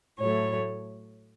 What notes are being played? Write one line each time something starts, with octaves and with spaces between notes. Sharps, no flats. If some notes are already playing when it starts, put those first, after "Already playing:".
A2 F#3 A3 C#5